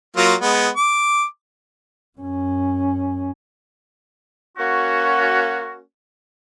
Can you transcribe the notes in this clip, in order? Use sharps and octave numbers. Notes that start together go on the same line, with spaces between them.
F#3 A#3 F4
G#3 B3
D6
F#2 C#4
A#3 C#4 F#4